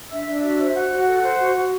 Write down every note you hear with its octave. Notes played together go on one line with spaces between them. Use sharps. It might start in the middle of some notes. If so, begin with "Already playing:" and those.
D4 E5 E6
D4
F#4
C5
F#4 F#5 F#6
F#4
A4
C5
F#4
F#4